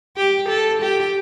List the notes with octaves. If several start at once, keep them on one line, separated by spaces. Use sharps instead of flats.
G4
A4
G4